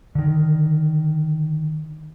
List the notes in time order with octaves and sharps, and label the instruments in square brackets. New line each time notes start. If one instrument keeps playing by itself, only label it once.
[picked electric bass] D3 D#3